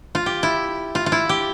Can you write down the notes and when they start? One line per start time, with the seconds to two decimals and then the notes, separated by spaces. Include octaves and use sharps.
0.15 F4
0.26 G4
0.43 E4
0.95 F4
1.06 F4
1.12 E4
1.29 G4